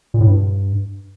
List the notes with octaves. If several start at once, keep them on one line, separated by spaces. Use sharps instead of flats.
A#2
A2
G2